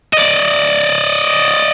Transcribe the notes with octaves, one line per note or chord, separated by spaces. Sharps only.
D5 D#5